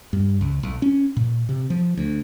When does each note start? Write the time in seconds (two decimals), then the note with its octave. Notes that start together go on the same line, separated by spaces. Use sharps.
0.13 G2
0.41 C#2
0.63 B1
0.82 C#4
1.16 A#2
1.49 C3
1.70 F3
1.97 D2